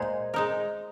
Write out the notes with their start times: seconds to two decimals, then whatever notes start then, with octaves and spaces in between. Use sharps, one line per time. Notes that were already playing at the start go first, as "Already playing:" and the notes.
Already playing: A#2 G#3 D#4 G#4 C5
0.34 G#3 D#4 A#4